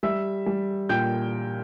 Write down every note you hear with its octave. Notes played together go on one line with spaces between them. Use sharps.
G3 E5 E6
G3
A#2 G5 G6